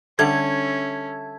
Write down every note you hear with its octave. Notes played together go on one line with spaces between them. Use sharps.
D3 G3 C#4 A4 E5 G#6